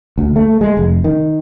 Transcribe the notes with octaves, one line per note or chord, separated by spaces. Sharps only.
D2
A3
G#3
F1
D#3